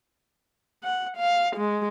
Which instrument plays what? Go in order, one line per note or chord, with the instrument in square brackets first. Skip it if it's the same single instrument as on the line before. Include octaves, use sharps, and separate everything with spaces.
[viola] F#5
F5
G#3